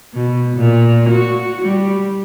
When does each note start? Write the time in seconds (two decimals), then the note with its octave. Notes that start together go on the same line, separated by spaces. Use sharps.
0.14 B2
0.57 A#2
1.09 F#4
1.62 G3